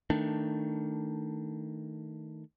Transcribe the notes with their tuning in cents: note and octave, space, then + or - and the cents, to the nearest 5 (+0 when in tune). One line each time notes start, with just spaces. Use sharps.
D#3 +15 A3 +15 D4 +5